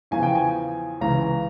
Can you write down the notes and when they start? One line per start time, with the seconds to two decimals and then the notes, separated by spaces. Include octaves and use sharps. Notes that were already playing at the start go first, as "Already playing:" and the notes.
0.11 E2 C#3 F3 G#5
0.23 G5
0.35 G#5
1.01 C#2 C#3 E3 A#5